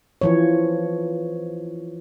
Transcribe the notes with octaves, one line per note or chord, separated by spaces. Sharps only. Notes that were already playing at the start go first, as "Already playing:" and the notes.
E3 F3 C#5